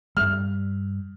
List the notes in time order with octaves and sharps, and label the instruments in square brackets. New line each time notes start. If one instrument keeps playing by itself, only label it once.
[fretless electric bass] G2 G3 [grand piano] F6